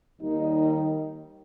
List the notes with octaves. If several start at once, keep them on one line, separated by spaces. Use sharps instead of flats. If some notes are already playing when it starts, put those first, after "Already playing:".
D#2 D#3 G3 D#4